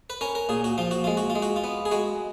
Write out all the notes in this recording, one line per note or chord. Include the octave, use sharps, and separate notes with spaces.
B4
C#4 A#4
A#4
A#2 G#4
F#4
F3 F4
F#4
G#3 F4
F#4
F4
G#3
F#4
F4
B3
G#4
G#3 F#4